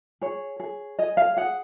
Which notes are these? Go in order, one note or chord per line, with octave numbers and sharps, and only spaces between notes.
G#4 C#5
G#4
G#4 D#5
F5
G#4 F#5